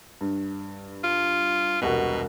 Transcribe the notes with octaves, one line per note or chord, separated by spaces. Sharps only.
G2
F4
E1 C2 B2 F#4